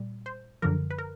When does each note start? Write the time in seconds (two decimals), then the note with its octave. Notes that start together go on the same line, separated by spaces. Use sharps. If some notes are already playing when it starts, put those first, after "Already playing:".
Already playing: A#2 G3
0.26 C5
0.62 F#2 D3 F3 A#4
0.91 B4
0.98 A#4